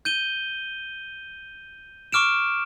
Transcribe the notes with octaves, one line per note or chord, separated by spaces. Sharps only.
G6 D#7 G7
C#6 D6 F6 D7 E7